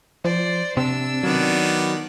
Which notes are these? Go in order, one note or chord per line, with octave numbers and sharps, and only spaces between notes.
F3 C5 D5
C3 C4 D4 E6
D#3 F#3 B3 D5